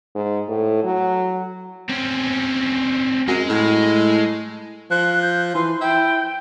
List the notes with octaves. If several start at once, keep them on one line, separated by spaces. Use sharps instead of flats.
G#2
A2
F#3
C4 C#4
F#2 G#3
A2
F3 F#6
G6
E3 C6
E4 G5